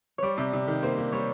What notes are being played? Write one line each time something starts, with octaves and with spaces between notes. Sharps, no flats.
G3 C#5 D5
C3
C3
D#3
A#3 C5
A#3
G3 C#5